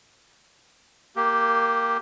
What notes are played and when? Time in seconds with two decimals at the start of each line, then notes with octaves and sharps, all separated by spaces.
1.16 A#3 G4